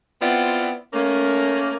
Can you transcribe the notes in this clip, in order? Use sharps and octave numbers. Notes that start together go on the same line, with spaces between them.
B3 C4 E4 F4 D5 F#5
A3 A#3 C#4